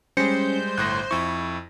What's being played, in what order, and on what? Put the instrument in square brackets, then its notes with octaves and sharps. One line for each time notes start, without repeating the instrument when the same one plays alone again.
[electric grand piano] G3 G#3 [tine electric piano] C#4 C#7 [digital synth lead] C5
[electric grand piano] G1 A2 A#6 [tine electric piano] F#6
[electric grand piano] F2 E4 [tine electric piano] C#6